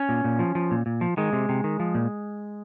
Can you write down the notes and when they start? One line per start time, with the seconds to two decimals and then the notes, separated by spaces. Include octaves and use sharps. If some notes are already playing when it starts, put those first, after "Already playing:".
Already playing: C#4
0.09 A#2
0.24 A#2
0.39 F3
0.55 F3
0.71 A#2
0.86 A#2
1.01 F3
1.17 D#3 G#3
1.33 C3
1.49 C3
1.64 D#3
1.80 F3
1.94 A#2